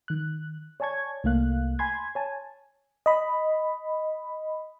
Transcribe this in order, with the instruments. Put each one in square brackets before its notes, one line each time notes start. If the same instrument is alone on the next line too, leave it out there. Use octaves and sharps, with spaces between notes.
[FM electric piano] D#3 F#6
C#5 D5 G#5 A5 C#6 G#6
C2 A3 A#3 F5 F#6
G#5 B5 C6 G#6
C#5 G#5 A5
D#5 B5